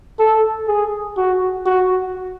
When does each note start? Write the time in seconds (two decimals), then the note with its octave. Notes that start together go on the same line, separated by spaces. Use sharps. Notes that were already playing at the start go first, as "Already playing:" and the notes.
0.19 A4
0.68 G#4
1.17 F#4
1.66 F#4